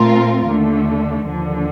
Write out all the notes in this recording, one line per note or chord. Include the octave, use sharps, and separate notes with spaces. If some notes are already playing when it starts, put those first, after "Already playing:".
Already playing: A#2 A3 C4 F4 A#4
D#2 D3 A3
D#2 D3 F3